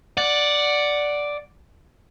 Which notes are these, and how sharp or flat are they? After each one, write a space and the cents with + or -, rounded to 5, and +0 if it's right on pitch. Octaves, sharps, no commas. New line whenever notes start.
D5 +0 F#5 +0